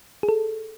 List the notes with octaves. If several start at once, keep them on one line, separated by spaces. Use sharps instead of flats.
G#4
A4